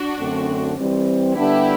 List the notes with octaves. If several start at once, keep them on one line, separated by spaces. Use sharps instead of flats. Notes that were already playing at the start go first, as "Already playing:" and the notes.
Already playing: D4 F#4
F#2 D3 A3 C4
E3 G3 C4
D3 G3 B3 D4 E4 G4